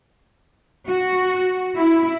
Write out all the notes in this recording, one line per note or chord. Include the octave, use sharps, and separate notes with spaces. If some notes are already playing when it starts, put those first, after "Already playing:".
F#4
E4